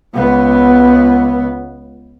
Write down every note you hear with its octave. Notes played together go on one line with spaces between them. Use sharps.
C#2 B3